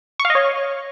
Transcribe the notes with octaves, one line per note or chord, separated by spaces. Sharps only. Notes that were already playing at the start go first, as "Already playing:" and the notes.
C#6
F5
D#5
C#5